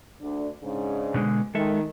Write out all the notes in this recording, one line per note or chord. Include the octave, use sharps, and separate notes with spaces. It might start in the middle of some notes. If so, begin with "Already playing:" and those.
D2 D3 D4
G#2 C#3 D4
B2 D3 G#3
D#3 G#3 A4 E5